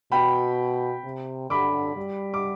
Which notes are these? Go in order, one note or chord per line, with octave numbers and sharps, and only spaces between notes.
B2 G5 B5
C3
D3 B5 D6
G3
D6